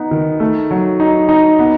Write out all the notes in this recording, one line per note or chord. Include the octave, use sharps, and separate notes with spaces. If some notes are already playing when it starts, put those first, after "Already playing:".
Already playing: B3 D#4
D#3
A3
F#3
D#4
D#4
B3